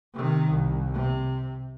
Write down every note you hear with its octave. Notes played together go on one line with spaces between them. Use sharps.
C3 D#3
C2
C3